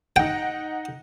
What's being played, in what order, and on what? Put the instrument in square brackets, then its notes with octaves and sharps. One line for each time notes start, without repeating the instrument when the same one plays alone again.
[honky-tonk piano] D#4 F#5 [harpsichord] G5